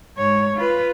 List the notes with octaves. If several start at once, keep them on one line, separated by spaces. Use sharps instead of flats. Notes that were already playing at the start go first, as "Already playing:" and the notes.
G#2 C#5
F4 B4